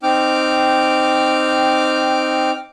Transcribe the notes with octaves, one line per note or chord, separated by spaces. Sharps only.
C4 D#4 G5 D6 F6